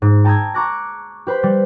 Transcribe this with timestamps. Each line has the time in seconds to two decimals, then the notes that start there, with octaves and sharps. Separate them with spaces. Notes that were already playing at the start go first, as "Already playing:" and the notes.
0.02 G#2
0.24 G5 A5 A#5 D#6 E6 G#6
0.54 A#5 C#6 D6 F#6 A#6
1.27 G4 B4 C5 B5
1.43 G3